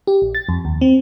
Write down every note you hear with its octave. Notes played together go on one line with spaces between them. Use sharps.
G4
A#1
A6
F2
D#2
C4